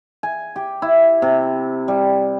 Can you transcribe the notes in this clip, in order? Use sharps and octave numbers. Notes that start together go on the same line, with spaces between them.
G#5
G4
E4
C3
G3